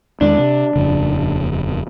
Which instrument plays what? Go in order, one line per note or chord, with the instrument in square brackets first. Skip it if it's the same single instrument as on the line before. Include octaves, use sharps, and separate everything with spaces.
[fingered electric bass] E2 D#3 G#3 [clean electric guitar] D4
[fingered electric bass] C3
D#1 F2 C#3